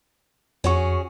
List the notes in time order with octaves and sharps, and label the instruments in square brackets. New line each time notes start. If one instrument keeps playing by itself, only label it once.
[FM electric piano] F2 C#6 [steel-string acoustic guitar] C#4 F#4 G#4